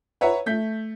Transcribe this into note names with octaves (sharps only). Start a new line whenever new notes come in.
B4 C#5 E5 F#5 A#5
A3 G6 B6